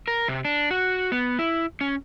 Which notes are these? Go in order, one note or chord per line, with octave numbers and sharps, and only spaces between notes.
A#4
C3
D4
F#4
B3
E4
C#4